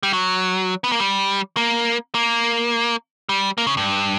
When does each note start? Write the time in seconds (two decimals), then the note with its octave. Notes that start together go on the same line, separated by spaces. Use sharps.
0.03 G3
0.13 F#3
0.84 B3
0.92 A#3
1.00 G3
1.57 A#3
2.15 A#3
3.29 G3
3.58 A#3
3.67 C#3
3.77 G2